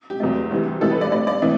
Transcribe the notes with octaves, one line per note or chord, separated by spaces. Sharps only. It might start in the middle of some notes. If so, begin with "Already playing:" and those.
G4
E2 C3 F#3 A3
D2 C3 E3 G3
A2 E3 G3 A4
B4
D5
A2 G3 D5
D5
A2 E3 A3